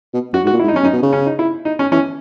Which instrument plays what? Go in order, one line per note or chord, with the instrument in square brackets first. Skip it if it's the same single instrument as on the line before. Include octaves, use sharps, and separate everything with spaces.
[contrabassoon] B2
[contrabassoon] F#2 [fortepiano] F#4
[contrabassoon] G#2
[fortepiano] F#4
[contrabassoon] A#2
[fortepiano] E4
[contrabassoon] G#2
[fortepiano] D#4
[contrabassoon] F#2
[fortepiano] C#4
[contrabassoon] F#2 [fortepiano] D#4
[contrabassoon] B2
C#3
[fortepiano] C#4
D#4
E4
D#4
C#4
[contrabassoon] E3 [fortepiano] C#4